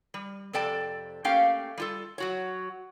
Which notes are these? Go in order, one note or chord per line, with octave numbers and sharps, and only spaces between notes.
G3
F2 C3 A4 D5 G5 A5
A3 A#3 C#4 G4 F5 G5
G3 F4 A4
F#3 F#4 C#5